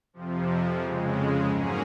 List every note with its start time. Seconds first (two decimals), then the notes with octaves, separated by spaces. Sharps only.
0.13 F2 C3 F3
0.80 F2 C#3 G#3
1.48 G#2 F#3 A#3 C#4 G#4